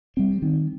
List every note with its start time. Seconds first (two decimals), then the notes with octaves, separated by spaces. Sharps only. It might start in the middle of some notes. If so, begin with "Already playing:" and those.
0.17 G3 C4
0.42 D#3